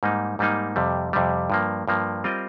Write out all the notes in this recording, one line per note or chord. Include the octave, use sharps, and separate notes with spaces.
G#2 G3 A#3 D#4
G#2 G3 A#3 D#4
F2 C3 G3
F2 C3 G3
G2 F3 A#3
G2 F3 A#3
G3 C4 F4 A#4 D#5